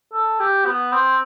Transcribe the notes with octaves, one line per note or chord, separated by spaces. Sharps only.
A4
G4
B3
C4